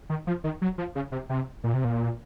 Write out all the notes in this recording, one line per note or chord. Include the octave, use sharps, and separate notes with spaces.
D#3
F3
D#3
F#3
F3
C#3
C3
C3
A#2
C3
A#2